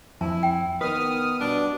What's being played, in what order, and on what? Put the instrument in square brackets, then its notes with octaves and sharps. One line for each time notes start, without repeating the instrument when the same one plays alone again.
[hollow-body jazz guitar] F2 [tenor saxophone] E4 [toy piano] A5
[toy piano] G5
[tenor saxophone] D#3 [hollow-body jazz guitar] B3 B4 [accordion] D#6 F6
[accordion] B2 G3 [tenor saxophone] D4